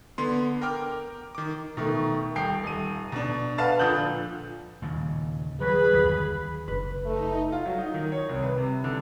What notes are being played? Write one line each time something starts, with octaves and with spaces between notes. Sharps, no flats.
D3 B3 C6
A#4 G5 D6 F6
D#3 D6
B2 D#3 A3
D#1 G5 C7
D#1 D#7
B2 D4
B4 F5 F#5 A5 A6
A#2 D3 F3 D#6 G6 F#7
D#2 A#2 C#3
F#3 G#4 B4 B5
G1 D#2 F#3
F#1 C#3 B4
A3 D#4
F4
F#3
D#4
D#3
C#5
C2
B4
C3
D3